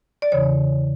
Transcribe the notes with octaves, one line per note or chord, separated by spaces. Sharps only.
D5
E2 C#3 E3 C#5